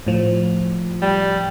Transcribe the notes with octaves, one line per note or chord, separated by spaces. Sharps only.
A2 F3
G3